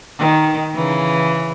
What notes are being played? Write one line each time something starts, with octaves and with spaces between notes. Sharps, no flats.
D#3
C#3 E3